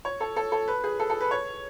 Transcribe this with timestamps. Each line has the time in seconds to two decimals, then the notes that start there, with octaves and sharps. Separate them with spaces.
0.05 C#5
0.20 A4
0.36 A4
0.52 A4
0.68 B4
0.84 G#4
0.99 A4
1.10 A4
1.21 B4
1.31 C#5